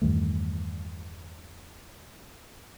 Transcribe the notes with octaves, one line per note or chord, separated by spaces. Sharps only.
E2 G2 D#3 A3